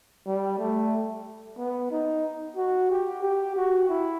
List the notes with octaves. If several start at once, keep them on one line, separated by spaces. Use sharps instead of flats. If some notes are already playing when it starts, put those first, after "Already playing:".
G3
A3
B3
D#4
F#4
G4
G4
F#4
E4